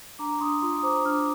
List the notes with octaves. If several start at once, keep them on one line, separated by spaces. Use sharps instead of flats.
D4 A#5 D6
D4 C6 D#6
F4 C6 D#6
D#6
C5 A#5 D6
D4 D6 F6